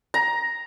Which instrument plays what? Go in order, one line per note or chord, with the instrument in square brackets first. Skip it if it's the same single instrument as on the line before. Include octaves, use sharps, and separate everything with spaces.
[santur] A#5